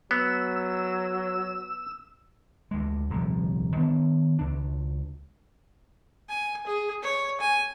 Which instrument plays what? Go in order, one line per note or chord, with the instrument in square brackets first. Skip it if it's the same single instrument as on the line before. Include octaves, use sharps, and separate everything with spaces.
[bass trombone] F#3 [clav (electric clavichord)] B3 [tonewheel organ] E6
[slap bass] D2 G#3
D#1 C2 A#2 F3
D#3 B3 D4
C#2 D4
[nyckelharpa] G#5
G#4
C#5
G#5